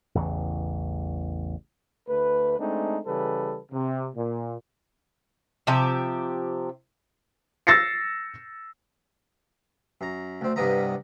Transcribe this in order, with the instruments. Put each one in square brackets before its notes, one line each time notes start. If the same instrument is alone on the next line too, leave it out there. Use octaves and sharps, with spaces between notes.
[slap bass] A1 E2 C#3 E3
[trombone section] D2 A3 B4
G#3 A3 C4 D4 D#4
C#3 E3 G3 A4 B4
C3
A#2
[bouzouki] C3 F3 G4 E5
[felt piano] E6 A6 A#6 C7 C#7
[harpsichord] F#2 A#5
D2 C4
C2 G2 G3 B3 D#5 A#5